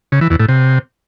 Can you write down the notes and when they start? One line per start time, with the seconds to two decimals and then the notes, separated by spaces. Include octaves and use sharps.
0.12 C#3
0.21 E3
0.30 E2
0.39 A2
0.48 C3